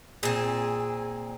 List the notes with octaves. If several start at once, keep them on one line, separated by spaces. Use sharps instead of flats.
A#2 C4 G#4